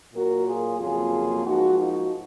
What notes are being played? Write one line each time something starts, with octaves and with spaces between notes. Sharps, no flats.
A#2 F#3 A#3 F#4 A#4
F4 G#4
F2 C#3 F#3 A#3 F4 G#4
G#2 F3 A#3 D#4 F#4
D#4 F#4